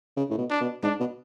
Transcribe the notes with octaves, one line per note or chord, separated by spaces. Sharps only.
C#3
A2
B2
D4
B2
G#2 D4
B2